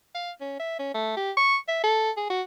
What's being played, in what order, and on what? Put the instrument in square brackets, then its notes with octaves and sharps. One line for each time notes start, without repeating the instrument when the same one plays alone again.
[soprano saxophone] F5
C#4
E5
C#4
A3
G4
C#6
E5
A4
G#4
F#4